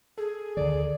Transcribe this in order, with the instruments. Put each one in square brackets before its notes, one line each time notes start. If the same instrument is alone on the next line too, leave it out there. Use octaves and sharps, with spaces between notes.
[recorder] G#4 [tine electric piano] A4
[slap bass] D2 D3 D#3 [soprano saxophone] D5